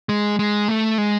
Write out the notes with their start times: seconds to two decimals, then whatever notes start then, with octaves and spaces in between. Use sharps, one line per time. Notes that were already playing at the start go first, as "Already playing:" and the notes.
0.09 G#3
0.39 G#3
0.68 A3
0.98 G#3